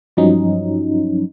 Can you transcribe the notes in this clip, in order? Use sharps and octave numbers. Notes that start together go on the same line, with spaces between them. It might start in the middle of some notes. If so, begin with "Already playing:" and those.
G2 F3 F#3 C#4 D#4